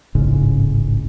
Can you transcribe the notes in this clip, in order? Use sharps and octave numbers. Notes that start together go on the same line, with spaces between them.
D1 A1 G#2 C#3